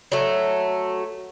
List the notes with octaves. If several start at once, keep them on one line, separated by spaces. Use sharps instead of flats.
F#3 A3